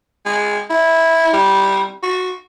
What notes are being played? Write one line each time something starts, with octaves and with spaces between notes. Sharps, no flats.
G#3
E4
G3
F#4